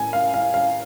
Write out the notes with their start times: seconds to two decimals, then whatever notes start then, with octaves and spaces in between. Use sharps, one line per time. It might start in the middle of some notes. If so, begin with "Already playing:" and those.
Already playing: A2 G#5
0.13 F5
0.34 F5
0.54 F5